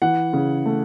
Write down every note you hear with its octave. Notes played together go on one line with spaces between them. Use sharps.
E3 F#5
C#3
A3